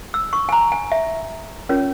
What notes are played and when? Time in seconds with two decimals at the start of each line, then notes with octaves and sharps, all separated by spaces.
0.14 E6
0.33 C#6
0.49 G#5
0.52 A#5
0.72 G#5
0.92 E5
1.69 C#4 F4 A#4 C#5